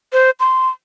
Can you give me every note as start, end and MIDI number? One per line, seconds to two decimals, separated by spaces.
0.13 0.30 72
0.40 0.68 84